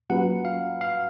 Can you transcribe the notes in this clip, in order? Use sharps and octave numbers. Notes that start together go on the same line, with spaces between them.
F#3 A#3 C#4 F4 B4 F#5
F5
F5